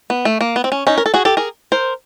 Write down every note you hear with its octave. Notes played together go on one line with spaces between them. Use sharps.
B3
A3
A#3
B3
C4
C#4
C#4 D#4
A#4
A4
F#4 G#4
G4 A4
G#4 A#4
A#4 C5